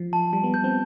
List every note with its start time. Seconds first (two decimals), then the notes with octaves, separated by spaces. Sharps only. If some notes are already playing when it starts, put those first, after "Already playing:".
Already playing: F3
0.13 A5
0.33 G3 A5
0.44 B3
0.54 B3 G6
0.64 C4